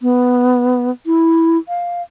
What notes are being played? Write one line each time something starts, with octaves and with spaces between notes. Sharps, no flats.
B3
E4
F5